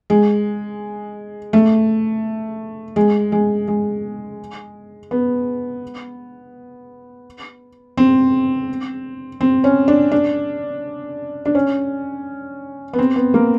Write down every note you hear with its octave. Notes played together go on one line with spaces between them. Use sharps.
G#3
A3
G#3
G#3
G#3
B3
C4
C4
C#4
D4
D4
D4
C#4
B3
C4
B3
A#3